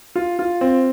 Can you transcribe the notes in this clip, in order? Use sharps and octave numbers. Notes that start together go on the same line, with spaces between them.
F4
F4
C4